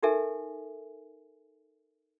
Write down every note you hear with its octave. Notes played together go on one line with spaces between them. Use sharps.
D#4 G4 A4 A#4 E5 G#5